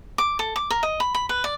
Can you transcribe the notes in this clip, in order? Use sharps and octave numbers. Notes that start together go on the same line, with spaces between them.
D6
A4
D6
A#4
D#5
B5
B5
B4
D5